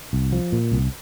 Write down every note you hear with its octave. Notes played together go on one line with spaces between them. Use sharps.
C2
F3
A#2
C2